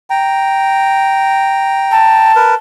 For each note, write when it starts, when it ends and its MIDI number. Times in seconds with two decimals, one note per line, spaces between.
0.10 2.32 79
0.10 2.32 82
1.91 2.54 81
2.35 2.55 70
2.35 2.55 71